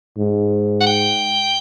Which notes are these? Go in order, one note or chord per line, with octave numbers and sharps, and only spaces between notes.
G#2
F#5
G5